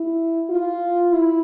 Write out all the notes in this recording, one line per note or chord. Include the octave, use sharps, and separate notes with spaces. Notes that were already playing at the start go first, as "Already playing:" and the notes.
Already playing: E4
F4
E4